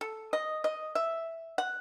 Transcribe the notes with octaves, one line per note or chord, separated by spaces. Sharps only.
A4
D#5
D#5
E5
F#5